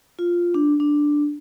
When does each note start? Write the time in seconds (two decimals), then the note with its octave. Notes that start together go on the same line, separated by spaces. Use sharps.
0.19 F4
0.54 D4
0.80 D4